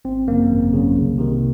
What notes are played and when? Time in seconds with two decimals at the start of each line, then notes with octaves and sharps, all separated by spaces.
0.05 G#1 C4
0.28 F#2 C#3 A#3
0.50 G#1
0.73 F#2 C#3
0.95 C2
1.18 C3 D#3